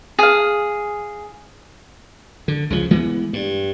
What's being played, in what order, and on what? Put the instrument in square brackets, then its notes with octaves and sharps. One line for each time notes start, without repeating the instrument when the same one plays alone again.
[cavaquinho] G#4 F5
[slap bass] D3
C#2 C#3 F3
E3 G#3 B3
G2